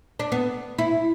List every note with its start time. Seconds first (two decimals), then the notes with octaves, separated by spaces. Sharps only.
0.19 D4
0.32 B3
0.78 E4